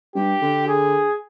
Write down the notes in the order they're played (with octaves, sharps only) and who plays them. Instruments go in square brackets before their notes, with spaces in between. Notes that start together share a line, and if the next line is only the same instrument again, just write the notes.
[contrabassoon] G2 [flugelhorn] G4
[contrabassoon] D3
[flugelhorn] G#4